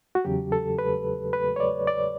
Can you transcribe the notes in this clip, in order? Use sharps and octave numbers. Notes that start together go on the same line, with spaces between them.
F#4
E2 C#3 F#3 G4
A4
B4
B4
C#5
D5
D5